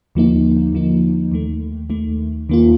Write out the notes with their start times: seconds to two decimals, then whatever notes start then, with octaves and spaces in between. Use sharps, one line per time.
0.15 D#2 D3 F3 A#3 D#4
0.73 D#2 D3 F3 A#3 D#4
1.32 D#2 D#3 A3
1.90 D#2 D#3 A3
2.49 D#2 D#3 A#3 F4